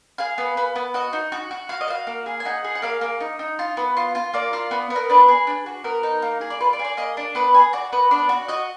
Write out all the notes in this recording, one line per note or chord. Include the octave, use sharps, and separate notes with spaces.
G#4 F5
B3
B3
B3
F#4 D#5
D#4
F#4
F#4
F#4 F5
D#5
F#4 F5
A#3
G#4
G#5
D#4 F#5
G#4
F#5
A#3 F5
A#3
D#4
D#4
F4
B3
F4
F4
A#3 D5
F4
B3
B3
A#4
D4 B4
G#4
D4
F#4
B3 A#4
D#4
A#3
G#4
D5
F4 B4
D5
G#4
D5
A#3 D#5
D4
B3 B4
G#4
F#4 D5
B3 B4
D4 D5
F#4
F#4 D#5